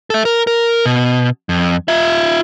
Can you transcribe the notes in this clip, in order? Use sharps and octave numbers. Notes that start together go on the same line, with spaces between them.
A4 E5
A#4
A#4
B2
F2
F4 E5